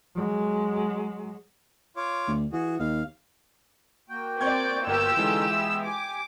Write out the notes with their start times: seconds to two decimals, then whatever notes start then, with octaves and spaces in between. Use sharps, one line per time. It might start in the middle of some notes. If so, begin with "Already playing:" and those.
0.16 F#3 G#3
1.96 F4 C#5 D6
2.28 D2
2.52 E3 F#4 G#4
2.79 D#2 F5
4.09 A#3 F#4 G5
4.41 C4 D5 C#6 G6 G#6
4.87 G1 F4 G4 A#4 E6
5.17 D3 E3 G#3 C#4 D#4
5.51 B3 E5
5.85 G4 G#5 D6